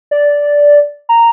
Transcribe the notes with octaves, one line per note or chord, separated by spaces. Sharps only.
D5
A#5